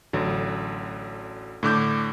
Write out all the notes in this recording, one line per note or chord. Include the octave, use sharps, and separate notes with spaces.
A1 D3 F#3
A2 D3 D6 G6